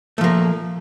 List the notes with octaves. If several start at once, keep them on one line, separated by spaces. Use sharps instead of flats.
F3 A3 A#3